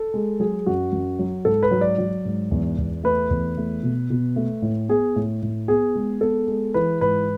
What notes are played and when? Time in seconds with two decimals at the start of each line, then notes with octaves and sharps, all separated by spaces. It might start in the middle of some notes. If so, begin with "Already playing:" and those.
Already playing: A4
0.14 G#3
0.40 F#3 G#4
0.66 F#2 F#4
0.92 F#2
1.19 F#3
1.45 G#2 A4
1.63 B4
1.71 F#3
1.81 D5
1.98 F#3
2.25 G#2
2.51 E2
2.78 E2
3.04 A3 B4
3.31 E2
3.57 A3
3.83 B2
4.10 B2
4.36 A3
4.62 A2
4.89 B3 G#4
5.16 A2
5.43 A2
5.68 B3 G#4
5.95 G#3
6.21 B3 A4
6.48 G#3
6.74 E3 B4
7.01 G#2 B4